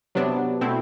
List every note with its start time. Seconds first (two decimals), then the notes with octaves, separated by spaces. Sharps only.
0.15 C3 F#3 B3 D4
0.61 B2 A3 C4 E4